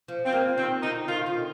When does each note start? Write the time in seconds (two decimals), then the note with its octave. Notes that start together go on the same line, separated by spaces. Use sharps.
0.08 F3
0.26 C4
0.32 G3 A#3
0.58 D#3 C4
0.82 D3 D#4
1.07 D#3 F4
1.26 D3